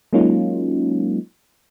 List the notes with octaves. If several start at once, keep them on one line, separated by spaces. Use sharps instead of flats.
F#3 G#3 A#3 C#4 D#4 F4